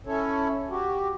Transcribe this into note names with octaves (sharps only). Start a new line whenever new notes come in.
C#4 E4 A4 C#5
F#4 G4